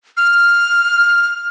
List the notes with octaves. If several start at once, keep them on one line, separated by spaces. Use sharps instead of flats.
F6